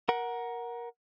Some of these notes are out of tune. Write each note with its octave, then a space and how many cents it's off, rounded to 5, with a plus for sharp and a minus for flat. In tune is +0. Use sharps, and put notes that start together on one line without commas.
A#4 +15 F#5 +0